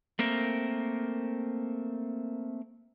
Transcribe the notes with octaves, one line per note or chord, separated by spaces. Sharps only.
A3 A#3 C4 A#4